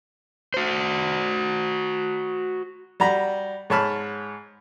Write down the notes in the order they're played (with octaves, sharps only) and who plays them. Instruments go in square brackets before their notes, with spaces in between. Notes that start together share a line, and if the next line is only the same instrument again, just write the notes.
[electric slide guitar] F#4 C5
[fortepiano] G3 F#4 A#5 B5
G#2 C#5 A5 B5 F6